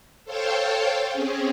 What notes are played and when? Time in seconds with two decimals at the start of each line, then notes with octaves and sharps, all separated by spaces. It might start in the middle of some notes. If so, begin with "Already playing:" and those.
0.25 A4 C5 C#5 F5 G5 A5
1.11 C4 C#4 G#4